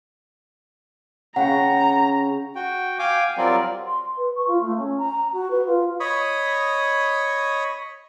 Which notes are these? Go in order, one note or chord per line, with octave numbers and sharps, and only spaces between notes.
C#3 F#5 G5 A#5 C#6
F#4 G5
F5 G5 G#5 D6
F#3 G3 C4 F4 A#4 D5
C6
B4
C#6
F4
A3
C#4
A#5
F#4
B4
F4
C#5 D#5 B5 C#6 D#6